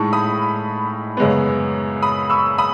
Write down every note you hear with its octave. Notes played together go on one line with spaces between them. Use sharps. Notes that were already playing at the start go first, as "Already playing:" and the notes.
Already playing: A2 G#3 D#4 A5 C#6
B5 D#6
F#2 C#3 G#3 B3
B5 D#6
C#6 E6
B5 D#6